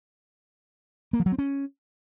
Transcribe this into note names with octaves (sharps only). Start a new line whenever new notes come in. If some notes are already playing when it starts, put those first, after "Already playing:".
A#3
F3
F#3
C4
C#4